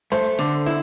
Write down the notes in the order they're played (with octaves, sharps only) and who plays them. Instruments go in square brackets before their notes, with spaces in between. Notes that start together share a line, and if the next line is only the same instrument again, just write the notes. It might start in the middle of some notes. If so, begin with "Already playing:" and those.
[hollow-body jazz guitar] A3 [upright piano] C5
[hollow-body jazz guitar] D3
E4